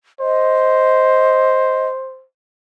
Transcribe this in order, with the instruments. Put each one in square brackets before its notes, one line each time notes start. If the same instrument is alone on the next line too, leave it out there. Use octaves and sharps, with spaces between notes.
[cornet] C5 [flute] D#5